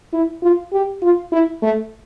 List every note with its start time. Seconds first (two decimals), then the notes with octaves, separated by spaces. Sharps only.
0.13 E4
0.42 F4
0.72 G4
1.02 F4
1.32 E4
1.62 A3